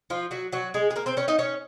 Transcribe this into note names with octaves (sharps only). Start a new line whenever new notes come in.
F3 F4
F#3 F#4
F#3 F#4
G#3 G#4
G#4
A#3 A#4
C4 C5
C#4 C#5
D#4 D#5
C#4 C#5